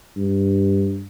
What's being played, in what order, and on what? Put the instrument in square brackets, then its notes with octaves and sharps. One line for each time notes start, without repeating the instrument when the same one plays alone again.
[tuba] G2